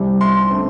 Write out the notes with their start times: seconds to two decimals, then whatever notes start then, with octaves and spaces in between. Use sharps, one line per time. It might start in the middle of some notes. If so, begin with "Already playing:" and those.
Already playing: C2 C3 G3 C4
0.21 C6
0.51 D3 A3 C4